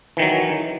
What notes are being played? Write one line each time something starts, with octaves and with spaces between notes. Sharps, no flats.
D#3 E3 F#3